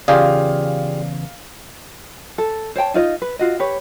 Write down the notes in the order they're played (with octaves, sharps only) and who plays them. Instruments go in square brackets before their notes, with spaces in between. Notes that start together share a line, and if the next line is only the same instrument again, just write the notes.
[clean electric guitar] E2 A#2 C#3 [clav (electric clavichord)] F4 G4 G#4 [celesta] D5 [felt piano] F5
[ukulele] A4
C5 C#5 G5 A5
D#4 F4 D5 D#5
B4
F4 F#4 D#5
G4 B4 C#5